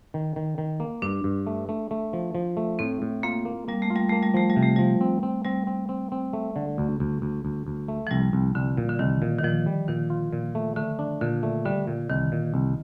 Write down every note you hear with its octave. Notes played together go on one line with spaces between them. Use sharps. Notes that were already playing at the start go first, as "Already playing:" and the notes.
D#3
D#3
D#3
A#3
G2 D4
G2
A3
A3
A3
F3
F3
A3
A2 C4
A2
A#3 F4
A#3
G3 A#3
A3
F4
G3
A3 A#3
G3
F3 A3
G3
C3
A3
F3 G3
C4
C4
G3 C4
C4
C4
C4
A3
D3
D2
D2
D2
D2
D2
A3
F3
C2 G3
C2
C2 D3
A#2
D3
C2 D#3
A#2
D#3
A#2 F3
G3
A#2 D#3
F4
A#2
A3
D3 A3
D4
A#2 D3
A3
D3 G3
A#2
C2 D#3
A#2
C2